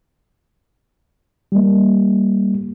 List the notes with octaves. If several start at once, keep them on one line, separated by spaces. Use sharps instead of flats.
G3 A#3